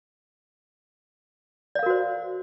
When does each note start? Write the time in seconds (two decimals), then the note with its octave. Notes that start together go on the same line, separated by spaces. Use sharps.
1.75 D5
1.79 F5
1.83 A#4
1.86 F#4
1.90 C5